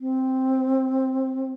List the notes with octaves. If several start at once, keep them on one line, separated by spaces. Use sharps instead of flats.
C4